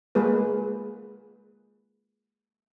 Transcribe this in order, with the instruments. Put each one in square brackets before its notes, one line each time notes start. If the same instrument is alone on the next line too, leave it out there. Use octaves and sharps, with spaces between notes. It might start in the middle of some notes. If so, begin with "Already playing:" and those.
[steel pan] G#3 A#3 G#4 B4